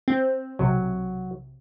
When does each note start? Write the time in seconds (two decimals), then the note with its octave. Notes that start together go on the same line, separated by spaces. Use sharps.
0.08 C4
0.59 B1 C3 F#3